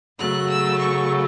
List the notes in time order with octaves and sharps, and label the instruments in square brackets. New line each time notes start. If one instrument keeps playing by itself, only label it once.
[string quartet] F#2 C#3 F#3 A3 F#6
E6
C#6